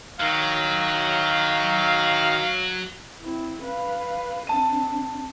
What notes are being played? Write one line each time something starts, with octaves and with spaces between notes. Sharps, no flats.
D#3 F#3 F5
C4 E4
B4 F5
C4 D4 A5 D#7